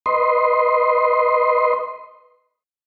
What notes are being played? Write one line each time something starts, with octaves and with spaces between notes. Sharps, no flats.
B4 D#5 C6